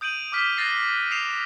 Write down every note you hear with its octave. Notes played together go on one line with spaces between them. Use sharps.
D#6 G6 D7 D#7 F#7
D6 D#6 F6 B6
F#6 A6 A#6 C7 D#7
D#6 C7 D7 E7 F7